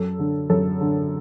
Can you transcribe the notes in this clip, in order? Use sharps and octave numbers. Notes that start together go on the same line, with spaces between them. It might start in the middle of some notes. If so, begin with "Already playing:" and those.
Already playing: F#2 A4
D3
F#2 A4
D3